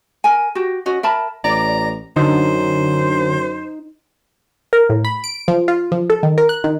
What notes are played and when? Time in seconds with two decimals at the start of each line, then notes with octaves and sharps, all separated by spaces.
0.24 A#4 G#5
0.55 F#4 G4
0.86 C#4 F#4 D#5
1.03 A#4 E5 A5 B5
1.44 A1 D5 A#5
2.17 F#2 D3 D#4 C5
4.73 A#4
4.89 A2
5.05 B5
5.24 D7
5.48 F3
5.68 F4
5.92 F3
6.10 A4
6.23 D#3
6.38 A#4
6.49 F#6
6.64 D#3